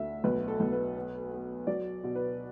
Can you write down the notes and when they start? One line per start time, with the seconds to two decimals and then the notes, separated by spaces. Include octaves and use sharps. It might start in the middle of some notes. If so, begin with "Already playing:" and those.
Already playing: D2 A3 E5
0.24 B1 B4
0.48 A4
0.60 B1
0.72 B4
0.96 B3
1.32 B3
1.67 F#3 D5
2.04 B2
2.15 B4